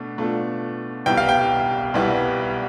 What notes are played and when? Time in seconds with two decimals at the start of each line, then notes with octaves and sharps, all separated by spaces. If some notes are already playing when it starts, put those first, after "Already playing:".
Already playing: B2 A3 D4
0.18 B2 A3 D4 F4
1.06 C2 B2 G3 B3 E4 G5
1.17 F5
1.29 G5
1.94 C2 B2 G3 B3 E4